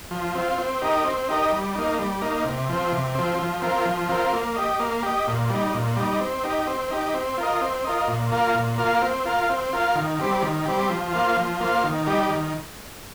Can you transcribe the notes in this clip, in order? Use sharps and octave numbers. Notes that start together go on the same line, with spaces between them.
F3
C4 F4
C4
D#4 G4 A#4 D#5
C4
D#4 G4 A#4 D#5
G3
A#3 D#4
G3
A#3 D#4
C3
F3 C4
C3
F3 C4
F3
C4 F4 A#4
F3
C4 F4 A#4
A#3
G4 D#5
A#3
G4 D#5
A#2
G3 D#4
A#2
G3 D#4
C4
D#4 G4
C4
D#4 G4
C4
F4 A#4 D#5
C4
F4 A#4 D#5
A#2
A#3 F4 A#4 F5
A#2
A#3 F4 A#4 F5
C4
F4 A#4 F5
C4
F4 A#4 F5
D#3
G3 C4 G4
D#3
G3 C4 G4
F3
A#3 F4 C5 F5
F3
A#3 F4 C5 F5
D#3
G3 D#4 G4
D#3